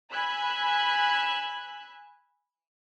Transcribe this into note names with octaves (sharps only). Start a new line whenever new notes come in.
G#5 B5 E6 F#6 G#6